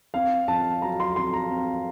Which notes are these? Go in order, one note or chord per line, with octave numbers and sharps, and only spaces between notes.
C4 F5
F2 A5
F#3 A#5
C6
F2 C6
A#5
C4